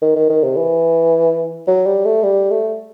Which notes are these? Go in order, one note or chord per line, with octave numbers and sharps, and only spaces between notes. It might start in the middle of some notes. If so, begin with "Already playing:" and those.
D#3
D#3
D#3
C3
E3
F#3
G3
A3
G3
A3